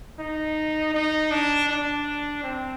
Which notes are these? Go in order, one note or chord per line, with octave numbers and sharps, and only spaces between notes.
D#4
D#4
D4
D4
C4